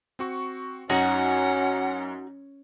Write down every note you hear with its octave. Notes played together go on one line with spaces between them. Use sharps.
C4 F#4 C#6
F#2 C#4 D#4 F#4 C#5 F#5 G#5 A#5